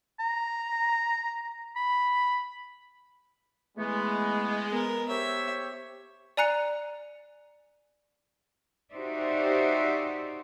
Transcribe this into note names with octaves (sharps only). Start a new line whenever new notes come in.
A#5
B5
E3 G#3 A3 B3
B3 A#4
G4 C5 C#5 E5
D5 G#5 A#5 F#6 C#7
D#4 F#4 G4 C5 D5 E5